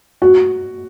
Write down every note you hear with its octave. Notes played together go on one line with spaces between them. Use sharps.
F#4